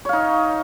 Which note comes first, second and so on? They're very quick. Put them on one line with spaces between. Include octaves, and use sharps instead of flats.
C#5 F5 D#4